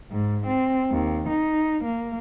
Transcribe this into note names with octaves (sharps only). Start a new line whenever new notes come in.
G#2
C4
D#2
D#4
A#3